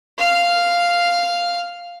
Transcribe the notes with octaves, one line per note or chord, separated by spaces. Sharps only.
F5 F6